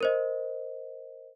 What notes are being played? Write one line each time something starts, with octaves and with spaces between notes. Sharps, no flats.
A#4 C5 D#5